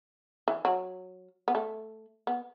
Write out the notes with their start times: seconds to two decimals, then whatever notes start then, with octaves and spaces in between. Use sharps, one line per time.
0.48 E3
0.65 F#3
1.48 B3
1.55 A3
2.27 B3